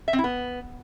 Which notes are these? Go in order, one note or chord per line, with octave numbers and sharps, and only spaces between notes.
E5
C4
E4
B3